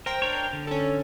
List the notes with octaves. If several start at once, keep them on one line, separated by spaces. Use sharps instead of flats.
A#4 C5 G5
D4 A#4 C#5
D3
C#4 A4